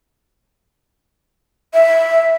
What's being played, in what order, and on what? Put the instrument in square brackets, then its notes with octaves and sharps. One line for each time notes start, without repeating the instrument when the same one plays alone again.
[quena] E5